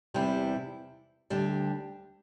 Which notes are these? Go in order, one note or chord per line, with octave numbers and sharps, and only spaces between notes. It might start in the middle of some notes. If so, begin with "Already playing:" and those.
E2 C3 G3 E4
D2 D3 G3 D4